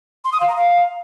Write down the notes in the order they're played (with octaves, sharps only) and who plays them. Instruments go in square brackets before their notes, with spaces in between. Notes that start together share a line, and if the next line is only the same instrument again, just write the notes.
[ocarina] C6
D#6
F5
A#5
F5